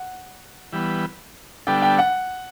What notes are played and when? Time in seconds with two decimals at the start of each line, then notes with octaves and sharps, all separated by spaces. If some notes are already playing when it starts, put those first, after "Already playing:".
Already playing: F#5
0.73 E3 G3 B3
1.67 D3 G3 B3 D4 A4 G5
1.82 G5
1.99 F#5